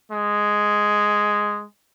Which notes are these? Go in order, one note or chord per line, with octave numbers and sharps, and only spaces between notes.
G#3